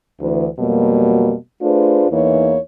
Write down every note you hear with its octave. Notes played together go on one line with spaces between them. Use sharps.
D2 E3
F2 B2 F#3 G3 A#3
A3 D4 F4 G#4 B4 C5
E2 E3 A#3 D#4 E4 C#5